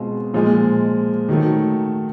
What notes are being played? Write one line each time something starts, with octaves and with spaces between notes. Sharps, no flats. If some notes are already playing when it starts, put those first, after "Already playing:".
Already playing: B2 G#3 C4 F4
A#2 F3 G#3
D#3 F#3 A3